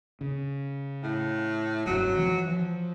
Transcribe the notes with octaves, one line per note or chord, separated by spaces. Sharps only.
C#3
A2
F1 G2 C3 F#3
E3 F3
F3